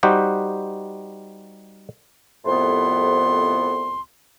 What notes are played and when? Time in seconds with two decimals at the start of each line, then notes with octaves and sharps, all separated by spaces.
0.03 G3 D#4 F#4 G4 C5 F#5
2.45 C2 F2 A2 B3 C6